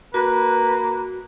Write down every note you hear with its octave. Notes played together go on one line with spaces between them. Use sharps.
A#3 F#4 B4